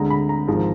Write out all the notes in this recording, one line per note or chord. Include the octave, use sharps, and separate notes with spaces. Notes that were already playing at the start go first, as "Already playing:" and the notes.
Already playing: D2 D3 G#3 A#5
B5
A#5
G#1 G#2 F3 G#3